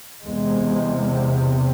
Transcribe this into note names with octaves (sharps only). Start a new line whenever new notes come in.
E2 C3 G#3